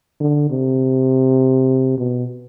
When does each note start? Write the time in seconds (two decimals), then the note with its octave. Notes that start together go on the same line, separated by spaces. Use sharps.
0.20 D3
0.50 C3
1.98 B2